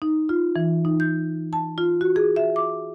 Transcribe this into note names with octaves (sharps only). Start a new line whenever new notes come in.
D#4
F4
E3
D#4
G6
A5
F4
F#4
G#4
E5
D6